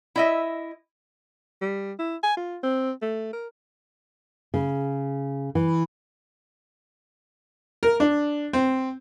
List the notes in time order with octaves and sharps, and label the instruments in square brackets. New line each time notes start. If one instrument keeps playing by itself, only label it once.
[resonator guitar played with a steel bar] E4 D#5 E5
[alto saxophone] G3
E4
G#5
F4
C4
A3
A#4
[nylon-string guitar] C#3
E3
[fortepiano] A#4
D4
C4